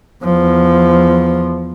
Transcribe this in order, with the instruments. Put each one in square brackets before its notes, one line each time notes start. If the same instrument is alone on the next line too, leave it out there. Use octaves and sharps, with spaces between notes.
[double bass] E2 F3